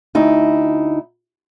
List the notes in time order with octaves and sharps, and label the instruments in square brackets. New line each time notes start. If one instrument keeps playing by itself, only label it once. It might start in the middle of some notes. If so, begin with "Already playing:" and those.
[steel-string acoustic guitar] D2 D#4 E4